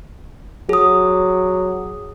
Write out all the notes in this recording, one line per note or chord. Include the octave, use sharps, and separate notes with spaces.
F#3 G#4 D#6